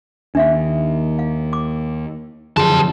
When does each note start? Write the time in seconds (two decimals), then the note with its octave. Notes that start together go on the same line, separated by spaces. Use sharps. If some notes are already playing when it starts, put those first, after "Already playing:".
0.35 D#2 D4 E5 F5
1.19 F5
1.53 D6
2.57 F1 F#2 D3 F3 G4 G#4 A5 C6